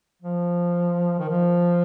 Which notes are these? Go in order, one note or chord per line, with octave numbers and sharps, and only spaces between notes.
F3
D#3
F3